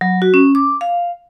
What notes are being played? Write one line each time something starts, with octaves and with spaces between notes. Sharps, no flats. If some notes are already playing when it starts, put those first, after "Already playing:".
F#3
F#4
C#4
D6
F5